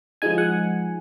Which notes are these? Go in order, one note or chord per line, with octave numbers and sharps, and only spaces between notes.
F3 G#3 D#4 G#5
F#5